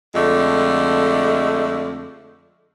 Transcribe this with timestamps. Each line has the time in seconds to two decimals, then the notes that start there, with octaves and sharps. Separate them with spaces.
0.15 F2 D3 G#3 A3